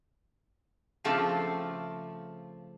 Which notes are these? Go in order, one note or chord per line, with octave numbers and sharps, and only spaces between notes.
C#3 F3 A3 C4 F4 D5